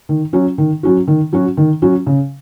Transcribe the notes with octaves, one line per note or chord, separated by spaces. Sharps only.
D#3
F#3 C#4 F#4
D#3
F#3 C#4 F#4
D#3
F#3 C#4 F#4
D#3
F#3 C#4 F#4
C#3